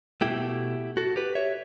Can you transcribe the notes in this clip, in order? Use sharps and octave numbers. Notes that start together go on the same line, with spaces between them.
B2 A3 E4 G4
F#4 A4
G4 B4
C#5 E5